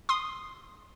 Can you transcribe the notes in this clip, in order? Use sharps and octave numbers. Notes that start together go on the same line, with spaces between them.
C6 D#6